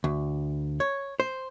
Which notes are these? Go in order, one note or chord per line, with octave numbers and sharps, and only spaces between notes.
D2
C#5
C5